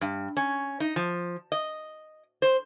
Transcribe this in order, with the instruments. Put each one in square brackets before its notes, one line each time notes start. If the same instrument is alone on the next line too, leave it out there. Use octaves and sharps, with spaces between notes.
[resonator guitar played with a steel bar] G2
C#4
D#4
F3
D#5
C5